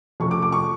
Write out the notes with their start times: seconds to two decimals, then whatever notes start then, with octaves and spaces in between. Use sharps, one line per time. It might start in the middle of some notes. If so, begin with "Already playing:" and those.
0.20 F2 C3 F3 A3 C#4 C#6
0.31 D6
0.42 D6
0.52 C#6